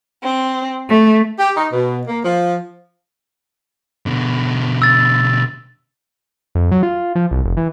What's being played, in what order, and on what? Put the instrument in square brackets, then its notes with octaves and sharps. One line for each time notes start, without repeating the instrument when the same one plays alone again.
[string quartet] C4
A3
[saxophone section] G4
D#4
B2
A#3
F3
[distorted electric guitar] B2 D3
[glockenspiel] E6 A6
[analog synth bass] F2
F#3
F4
F3
C2
F1
E3